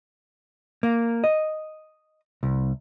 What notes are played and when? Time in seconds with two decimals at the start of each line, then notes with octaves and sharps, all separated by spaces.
0.83 A#3
1.24 D#5
2.43 C2